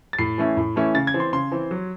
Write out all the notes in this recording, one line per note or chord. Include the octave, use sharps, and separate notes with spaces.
A6
A2 C7
E3 A3 C#4 E4
A2
E3 A3 C#4 E4
C#3 A6
G#6
E3 C4
C6
C#3 C6
E3 C4
F#3